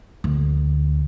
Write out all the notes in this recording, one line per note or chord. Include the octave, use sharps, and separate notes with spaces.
D2